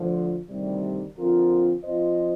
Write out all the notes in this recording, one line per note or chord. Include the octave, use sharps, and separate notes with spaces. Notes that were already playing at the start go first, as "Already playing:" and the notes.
Already playing: D2 D3 F3
D2 C3 D#3 G3
D3 F3 C4 F4 A#4
F3 C4 F4 C5 D#5